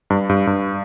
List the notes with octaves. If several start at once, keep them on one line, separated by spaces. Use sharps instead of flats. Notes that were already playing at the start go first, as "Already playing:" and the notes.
G2
G2
G2